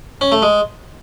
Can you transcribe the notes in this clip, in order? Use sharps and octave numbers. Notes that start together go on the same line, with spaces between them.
C#4
A3
G#3